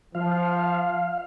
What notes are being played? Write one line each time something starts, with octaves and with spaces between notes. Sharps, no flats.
F3 F5